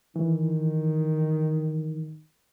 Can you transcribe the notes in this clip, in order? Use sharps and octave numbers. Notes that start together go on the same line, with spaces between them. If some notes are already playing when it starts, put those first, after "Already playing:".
D#3 E3